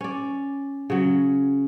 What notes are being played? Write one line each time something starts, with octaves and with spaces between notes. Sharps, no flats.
C#4 D5
C#3 F#3